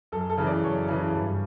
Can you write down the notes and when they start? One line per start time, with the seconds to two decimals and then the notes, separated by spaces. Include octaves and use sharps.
0.12 F#2 A4
0.30 A4
0.38 C#3 E3
0.46 D5
0.63 F#2 C#5
0.88 C#3 E3
1.14 G2